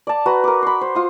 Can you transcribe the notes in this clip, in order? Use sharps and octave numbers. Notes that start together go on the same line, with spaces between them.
D5 A5
F#4 B4 A#5
A#4 D6
B5 C6
C5
F4 D#6